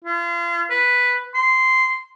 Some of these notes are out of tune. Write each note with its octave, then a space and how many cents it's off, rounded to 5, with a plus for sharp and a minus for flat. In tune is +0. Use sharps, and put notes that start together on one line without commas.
F4 -35
B4 +0
C6 -10